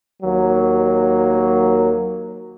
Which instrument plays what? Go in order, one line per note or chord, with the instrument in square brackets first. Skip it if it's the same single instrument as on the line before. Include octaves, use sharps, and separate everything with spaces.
[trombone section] D#2 F#3 A#3